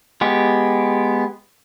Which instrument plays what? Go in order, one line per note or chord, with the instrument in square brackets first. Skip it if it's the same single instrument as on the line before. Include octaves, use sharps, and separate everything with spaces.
[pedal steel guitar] G#3 B3 G4